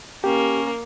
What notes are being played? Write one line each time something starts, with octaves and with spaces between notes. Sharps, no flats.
A#3 C#4 G4